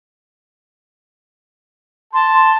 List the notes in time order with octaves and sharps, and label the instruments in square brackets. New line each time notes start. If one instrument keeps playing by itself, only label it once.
[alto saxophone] A5 [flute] C6